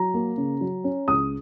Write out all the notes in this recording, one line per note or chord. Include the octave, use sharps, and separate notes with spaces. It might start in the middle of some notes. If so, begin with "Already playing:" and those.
Already playing: F#3 A#5
A#3
C#3
F#3
C#4
C#2 D#6